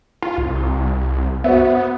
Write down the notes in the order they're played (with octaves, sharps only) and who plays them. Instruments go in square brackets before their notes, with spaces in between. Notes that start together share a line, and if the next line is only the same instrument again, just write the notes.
[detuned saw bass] F4
C2
[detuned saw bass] B3 [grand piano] F#4 C5 E5